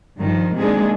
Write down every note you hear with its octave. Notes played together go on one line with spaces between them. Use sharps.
G2 D#3 F3
C3 D#3 G#3 A#3 D4 G#4